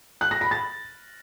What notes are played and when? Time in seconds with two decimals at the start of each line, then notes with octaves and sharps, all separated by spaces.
0.21 F#6
0.31 A#6
0.41 B5
0.51 A6